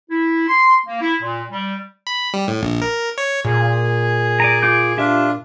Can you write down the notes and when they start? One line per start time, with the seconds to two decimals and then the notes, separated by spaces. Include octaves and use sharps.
0.10 E4
0.48 C6
0.86 A#3
1.01 E4
1.21 A#2
1.50 G3
2.07 B5
2.34 G3
2.48 A2
2.62 A#1
2.82 A#4
3.18 C#5
3.45 A#2 G#4
4.40 D5 G#5 A#5
4.62 F4 D6 G6
4.98 D4 F4 G4 E5